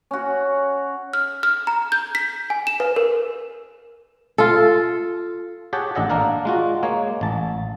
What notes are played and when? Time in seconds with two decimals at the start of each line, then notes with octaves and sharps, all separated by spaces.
0.11 C#4 F#4
1.13 F6
1.43 F6
1.67 A#5
1.92 G6
2.15 B6
2.50 G#5
2.67 E7
2.80 B4
2.96 A#4
4.38 F4 A4
5.73 G4 G#4 C#5 F#5 G5 A5
5.95 A1 D4 A4 D#5 F#5 A5
6.10 A#3 D4 A#4 F#5
6.45 G#3 F4 F#4
6.83 G#3 A#3 C#5
7.21 A1 A5